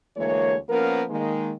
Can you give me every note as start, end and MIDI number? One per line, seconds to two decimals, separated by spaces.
0.16 0.56 38
0.16 0.56 52
0.16 0.56 56
0.16 0.56 58
0.16 0.56 73
0.69 1.03 53
0.69 1.03 58
0.69 1.03 59
0.69 1.03 61
0.69 1.03 70
1.09 1.53 51
1.09 1.53 56
1.09 1.53 58